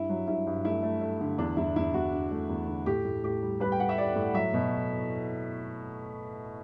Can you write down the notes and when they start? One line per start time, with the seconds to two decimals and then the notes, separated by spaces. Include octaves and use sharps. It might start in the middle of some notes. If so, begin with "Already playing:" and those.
Already playing: G2 E4
0.09 F#3
0.28 G2 E4
0.47 G2
0.65 A3 E4
0.83 A3
1.01 A3
1.21 D3
1.38 E2 D4
1.57 E2 E4
1.76 E2 E4
1.94 E2 F#4
2.13 D3
2.31 A3
2.50 E2
2.68 D3
2.86 A2 G4
3.05 A2
3.24 A2 G4
3.42 G3
3.60 G3 B4
3.72 G5
3.79 G3 F#5
3.89 E5
3.98 G3 D5
4.15 A2
4.34 F#3 E5
4.54 B2